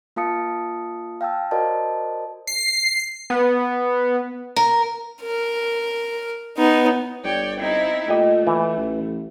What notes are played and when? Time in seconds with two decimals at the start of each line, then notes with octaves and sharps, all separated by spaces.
0.16 A#3 F4 F5 A5 D#6 C#7
1.21 F5 G5 A5 E6
1.51 F#4 A#4 C5 D5 D#5 A5
2.47 C7
3.30 B3
4.56 A#4
5.22 A#4
6.58 B3 D#4
7.24 G1 C#5 D5 G5
7.59 C4 D#4 E4
8.08 A#2 A3 G4 D#5
8.47 E3
8.77 A1